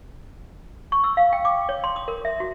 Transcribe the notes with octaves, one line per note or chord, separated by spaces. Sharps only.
C#6
E6
F5
G5
D6
C#5
C6
D#6
A#4
E5
F#4